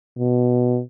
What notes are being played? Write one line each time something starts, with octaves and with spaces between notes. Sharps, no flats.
B2